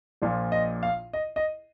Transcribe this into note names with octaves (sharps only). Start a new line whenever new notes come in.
A#1 A#2 F3
D#5
F5
D#5
D#5